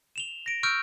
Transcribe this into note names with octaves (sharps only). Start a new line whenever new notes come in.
E7 F7 G7
A#6 D7
C#6 E6 F6 G6 D7